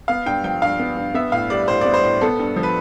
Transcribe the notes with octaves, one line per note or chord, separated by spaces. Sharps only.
B3 F5
G2 G5
F3 G5
G2 F5
B3
G2
B3 E5
A2 F5
G3 D5
A2 C5
B3 D5
C5
A2
B3 A4
G2
F3
B4